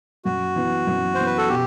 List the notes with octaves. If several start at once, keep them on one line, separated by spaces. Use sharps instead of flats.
F#2 F#4
E3 B3
F#2
E3 B3 C5
B4
A4
B2 G4